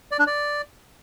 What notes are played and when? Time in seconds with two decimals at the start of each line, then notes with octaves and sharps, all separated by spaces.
0.11 D5
0.19 D4
0.27 D5